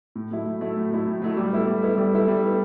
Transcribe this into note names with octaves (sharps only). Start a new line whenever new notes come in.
A2
F#3 A3 E4
A2
F#3 A3 E4
A2
F#3 A3 E4
A2
F#3 A3 E4
G3
B3 E4 A4
G3
B3 E4 A4
G3
B3 E4 A4
G3
B3 E4 A4